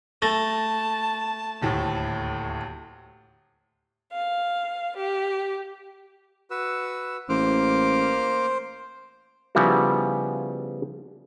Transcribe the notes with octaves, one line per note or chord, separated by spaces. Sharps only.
A3 A5 A6 A#6
D#1 D2 A2
F5
G4
F#4 B4 E6
A1 A#3 C5 D6 F6
C#3 F3 G3 B3 E4 F#4